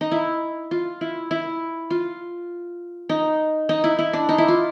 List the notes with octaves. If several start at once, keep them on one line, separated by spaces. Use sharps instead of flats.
D#4
E4
F4
E4
E4
F4
D#4
D#4
E4
E4
D4
D#4
E4
F4